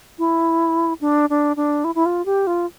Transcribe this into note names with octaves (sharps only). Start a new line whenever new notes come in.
E4
D4
D4
D4
E4
E4
F4
G4
F4